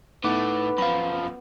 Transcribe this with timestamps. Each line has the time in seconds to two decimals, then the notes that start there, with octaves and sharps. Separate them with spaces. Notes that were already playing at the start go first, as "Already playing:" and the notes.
0.24 A2 A3 B3 D#4 B4 D6
0.78 F#2 F3 F5 B5